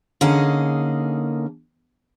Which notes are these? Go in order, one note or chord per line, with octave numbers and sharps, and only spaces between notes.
D3 A#3 C#4 D#4 G#4